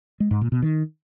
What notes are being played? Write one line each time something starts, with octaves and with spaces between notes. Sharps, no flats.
G#3
G#2
A#2
B2
D#3